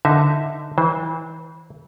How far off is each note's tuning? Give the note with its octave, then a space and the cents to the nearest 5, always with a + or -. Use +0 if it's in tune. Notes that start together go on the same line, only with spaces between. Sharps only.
D3 +0 D#4 +0 E5 -5
E3 -30 C5 +0